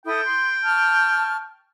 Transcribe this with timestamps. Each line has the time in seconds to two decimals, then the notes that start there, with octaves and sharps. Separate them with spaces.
0.06 E4 A4 G5 D#6
0.25 C6
0.65 A5 C#6 F6